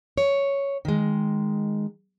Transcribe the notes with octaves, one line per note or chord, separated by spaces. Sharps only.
C#5
D#3 G#3